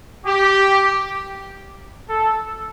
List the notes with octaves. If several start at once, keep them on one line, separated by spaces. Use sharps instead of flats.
G4
A4